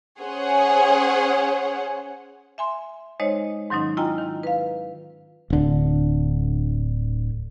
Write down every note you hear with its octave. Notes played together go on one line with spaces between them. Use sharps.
C#4 G#4 C5 C#5 F#5
E5 G#5 C6
G#3 D#4 C5 C#5 D#5
G#2 D#3 F#3 C#4 D#4
E4 F4 D#5 G5 G#5 A#5
D#3
B4 F5
D1 D3